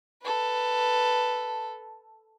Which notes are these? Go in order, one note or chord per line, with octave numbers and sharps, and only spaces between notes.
A4 B4